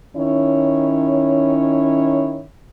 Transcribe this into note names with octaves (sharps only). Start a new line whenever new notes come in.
D#3 C#4 E4 C#5